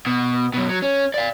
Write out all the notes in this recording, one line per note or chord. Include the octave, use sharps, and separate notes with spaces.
B2
F#2 B2
F#3
C#4
D5 F5